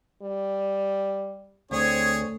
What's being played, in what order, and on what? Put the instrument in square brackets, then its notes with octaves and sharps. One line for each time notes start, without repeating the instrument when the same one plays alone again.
[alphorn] G3
[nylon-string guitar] D2 [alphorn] C4 [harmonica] G#4 C#5